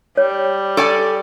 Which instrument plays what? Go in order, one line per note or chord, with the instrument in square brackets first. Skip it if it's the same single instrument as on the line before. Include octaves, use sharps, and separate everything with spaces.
[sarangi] G3 [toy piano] C#5
[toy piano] G4 G5 [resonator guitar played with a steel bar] A4 D5 G#5